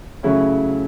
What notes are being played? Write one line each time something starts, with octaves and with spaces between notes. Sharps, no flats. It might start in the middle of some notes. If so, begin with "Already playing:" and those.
C#3 F#3 A3 C#4 E4